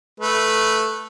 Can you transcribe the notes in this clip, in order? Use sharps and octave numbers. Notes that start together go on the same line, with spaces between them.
A3 B4